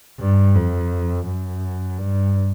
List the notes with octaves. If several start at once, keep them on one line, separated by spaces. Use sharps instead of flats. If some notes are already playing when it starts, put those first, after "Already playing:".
G2
F2
F#2
G2